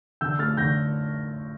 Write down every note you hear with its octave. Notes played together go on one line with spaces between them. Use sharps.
D3 E6 G6
A3 F6 A6
D3 G6 A#6